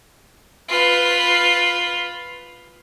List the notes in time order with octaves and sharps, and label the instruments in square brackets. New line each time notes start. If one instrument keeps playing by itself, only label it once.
[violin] F4 B4